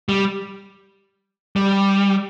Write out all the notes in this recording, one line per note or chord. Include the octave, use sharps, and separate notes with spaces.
G3
G3